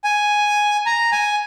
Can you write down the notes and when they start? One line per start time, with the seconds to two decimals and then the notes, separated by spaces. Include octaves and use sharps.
0.04 G#5
0.86 A#5
1.12 G#5